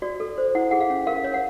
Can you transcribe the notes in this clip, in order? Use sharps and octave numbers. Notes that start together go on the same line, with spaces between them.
F#4 D5
A4
C5
E4 F#5
G#4 F#5
F5
C#4
A#4 F5
C#5
F#5